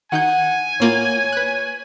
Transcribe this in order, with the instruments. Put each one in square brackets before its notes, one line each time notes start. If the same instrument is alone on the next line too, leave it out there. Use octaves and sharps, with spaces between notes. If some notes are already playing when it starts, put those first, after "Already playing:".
[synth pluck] D#3 D#4 G6 [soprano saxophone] F#5 [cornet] G#5
[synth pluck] A2 A#3 F4 [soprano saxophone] C#5
[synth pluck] B4 F#6